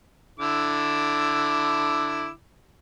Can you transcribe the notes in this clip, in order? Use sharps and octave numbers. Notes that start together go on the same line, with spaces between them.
D3 E4 D6